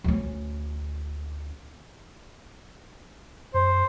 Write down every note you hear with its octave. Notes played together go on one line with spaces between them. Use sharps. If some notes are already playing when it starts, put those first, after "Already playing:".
D2 C#4
F#2 C5